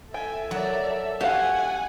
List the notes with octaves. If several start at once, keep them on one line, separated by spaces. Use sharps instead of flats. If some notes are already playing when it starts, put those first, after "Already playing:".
A4 E5 G5 G#5
F#3 F#4 A#4 D5
F#4 G4 F5 F#5 G#5